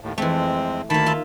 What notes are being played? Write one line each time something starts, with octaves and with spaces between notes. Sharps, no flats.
D#2 A2
F2 E3 G#3 A3 C4
D2 D#3 A#3 A5 B5
F4 E5